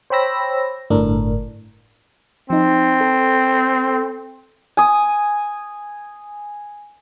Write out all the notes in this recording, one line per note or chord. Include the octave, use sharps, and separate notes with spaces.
C5 C#5 G5 B5 E6 A#6
G1 A2 D4 A#4
F3 C4 D#4
A4
G#5 D#6